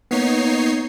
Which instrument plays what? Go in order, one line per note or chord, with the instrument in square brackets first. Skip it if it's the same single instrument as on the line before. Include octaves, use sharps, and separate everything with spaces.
[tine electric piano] A#3 B3 [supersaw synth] D#4 C#5 C7